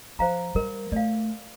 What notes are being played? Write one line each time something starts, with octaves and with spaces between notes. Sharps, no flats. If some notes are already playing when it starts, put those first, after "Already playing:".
F3 C5 F5 A#5
G3 A#4
A3 D5 F5